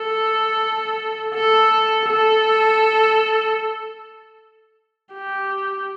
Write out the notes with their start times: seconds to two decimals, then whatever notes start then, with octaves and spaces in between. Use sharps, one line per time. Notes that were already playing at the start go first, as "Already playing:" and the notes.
Already playing: A4
1.35 A4
2.10 A4
5.13 G4